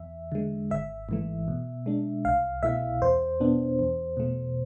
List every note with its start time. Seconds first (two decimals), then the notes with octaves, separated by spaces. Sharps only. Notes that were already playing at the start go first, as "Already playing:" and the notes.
Already playing: E2 E5
0.32 D3 G#3
0.71 G#1 E5
1.09 G#2 E3 A3
1.48 B2
1.86 G#3 D4
2.25 C2 F5
2.63 B2 A3 E4 E5
3.01 E2 C5
3.40 B2 B3 D4
3.79 E2
4.17 B2 A3